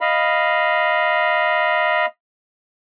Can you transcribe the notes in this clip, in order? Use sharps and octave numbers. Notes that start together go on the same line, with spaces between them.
D#5 F5 B5